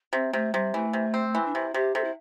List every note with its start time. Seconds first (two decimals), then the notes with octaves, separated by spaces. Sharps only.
0.13 C3 C4
0.33 C3 A3
0.54 C3 G3
0.74 E3 A3
0.93 C3
1.14 C4
1.35 E3
1.45 D4
1.54 C3 E4
1.74 C3 G4
1.95 C3 A4
2.04 E4